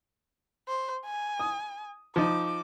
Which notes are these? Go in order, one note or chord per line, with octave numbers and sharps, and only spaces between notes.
C5
G#5
D#6
F3 D#4 D6